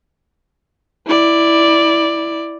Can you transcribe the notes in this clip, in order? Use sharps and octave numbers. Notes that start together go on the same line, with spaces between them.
E4 D5